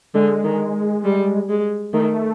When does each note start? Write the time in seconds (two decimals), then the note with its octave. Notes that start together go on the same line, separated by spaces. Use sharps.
0.14 D3 G#3
0.44 D#3
1.04 G3
1.49 G#3
1.93 D#3 A3